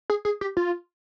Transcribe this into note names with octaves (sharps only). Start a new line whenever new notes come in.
G#4
G#4
G4
F4